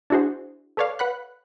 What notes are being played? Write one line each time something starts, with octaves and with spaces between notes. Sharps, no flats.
D4 E4 F#4 G#4 C5
A4 B4 C#5 D5 F5
B4 F#5 B5 F#6